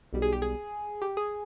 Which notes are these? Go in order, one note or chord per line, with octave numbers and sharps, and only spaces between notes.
B1 B2 G3
G#4
G4
G#4
G4
G#4